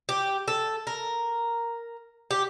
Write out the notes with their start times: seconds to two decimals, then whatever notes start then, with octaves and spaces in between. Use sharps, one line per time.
0.09 G4
0.48 A4
0.87 A#4
2.31 G4